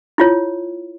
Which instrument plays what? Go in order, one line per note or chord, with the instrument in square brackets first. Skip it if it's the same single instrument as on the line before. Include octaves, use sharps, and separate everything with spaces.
[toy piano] E4 F4 C#5